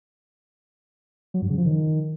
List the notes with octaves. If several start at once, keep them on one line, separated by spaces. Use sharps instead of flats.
F#3
G2
C#3
F3
D#3